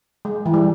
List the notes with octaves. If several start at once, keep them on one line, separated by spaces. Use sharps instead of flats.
G#3
E3
G3